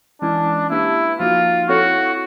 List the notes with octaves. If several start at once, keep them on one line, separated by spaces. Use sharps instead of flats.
E3 G#3 C#4 D4 E4
A#3 D4 E4 G4 B4
F3 A#3 D#4 F4 F#4
C4 E4 F#4 A4 C#5